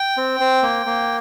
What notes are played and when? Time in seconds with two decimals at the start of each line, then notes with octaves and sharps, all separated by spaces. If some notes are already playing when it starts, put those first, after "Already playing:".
Already playing: G5
0.17 C4
0.40 C4
0.62 A#3
0.86 A#3